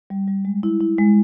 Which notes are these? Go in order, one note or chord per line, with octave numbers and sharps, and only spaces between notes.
G3
G3
G#3
E4
E4
G#3